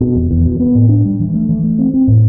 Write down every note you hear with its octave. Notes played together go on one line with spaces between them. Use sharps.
B2
E2
E2
B2
B3
A2
D4
G3
E3
A3
E3
A3
C4
C4
A2